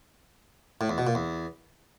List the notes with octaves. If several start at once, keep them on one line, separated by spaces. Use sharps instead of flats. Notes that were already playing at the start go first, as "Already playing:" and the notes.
A2
E2
B2
A#2
E2